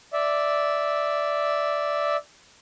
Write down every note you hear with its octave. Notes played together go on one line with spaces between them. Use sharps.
D5 E5